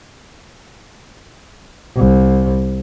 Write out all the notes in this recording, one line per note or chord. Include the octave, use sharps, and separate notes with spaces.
C2